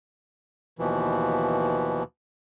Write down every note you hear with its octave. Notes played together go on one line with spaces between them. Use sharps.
D#2 B2 E3 F3